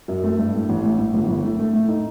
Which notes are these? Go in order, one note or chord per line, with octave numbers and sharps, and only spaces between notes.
F#2
A3
G2
A2
A1
A2
A2
G1
G1
A3
A3
A2
D#4